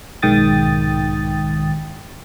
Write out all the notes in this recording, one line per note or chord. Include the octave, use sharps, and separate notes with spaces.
B1 G#2 D#3 G5 D#6 A6